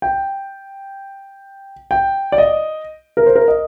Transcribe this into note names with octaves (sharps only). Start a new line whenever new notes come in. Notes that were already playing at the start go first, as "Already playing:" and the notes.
G5
G5
D5
D#5
A#4
C5
A#4
D#5